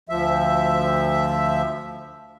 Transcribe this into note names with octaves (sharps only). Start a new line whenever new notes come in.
D2 F3 E5